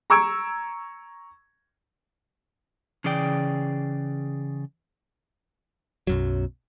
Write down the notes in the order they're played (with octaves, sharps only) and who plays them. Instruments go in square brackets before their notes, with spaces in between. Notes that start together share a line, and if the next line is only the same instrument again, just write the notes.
[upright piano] A#5 C#6 E6 G#6 D7
[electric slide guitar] C#3 E3 G#4 D5 G5
[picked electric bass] B1 F#2 F#3